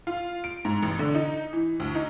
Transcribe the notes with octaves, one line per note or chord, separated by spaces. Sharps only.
F4
D7
G#2
A1
D3
D#4
E3
D2
D#4